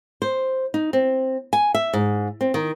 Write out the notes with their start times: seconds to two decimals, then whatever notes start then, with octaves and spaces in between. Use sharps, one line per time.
0.22 C5
0.74 D#4
0.93 C4
1.53 G#5
1.75 E5
1.93 G#2
2.41 C4
2.54 D#3